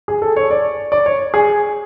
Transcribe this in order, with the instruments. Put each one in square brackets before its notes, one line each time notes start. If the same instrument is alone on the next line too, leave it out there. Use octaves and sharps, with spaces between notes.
[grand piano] G#4
A4
C#5
D5
D5
C#5
G#4